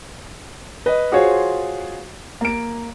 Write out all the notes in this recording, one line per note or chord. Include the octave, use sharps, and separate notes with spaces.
B4 D#5
F4 F#4 G#4 C5 C#5
A#3 D7